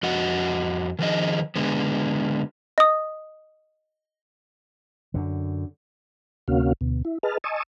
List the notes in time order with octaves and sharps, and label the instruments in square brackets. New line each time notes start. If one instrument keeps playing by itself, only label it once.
[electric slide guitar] F2 F#4 D#5 F#5
D#3 F3 G#4 D#5
D3 G#3 B3
[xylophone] D#5 D#6
[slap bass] F#2 D3
[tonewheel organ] D2 C3 A#3 C#4 F#4 F5
D2 B2
E4
G#4 B4 D#5 A5 F6
D#5 G#5 A5 C#6 D#6 E6